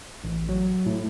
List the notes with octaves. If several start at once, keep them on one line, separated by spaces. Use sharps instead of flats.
A1
F#3
A2